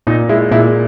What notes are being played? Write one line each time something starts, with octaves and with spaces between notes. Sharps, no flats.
A#2 D#4
G#3 E4
A#2 E4